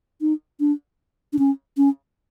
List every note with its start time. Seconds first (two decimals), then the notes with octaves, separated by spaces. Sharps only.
0.21 D#4
0.60 D4
1.33 D4
1.39 C#4
1.77 C#4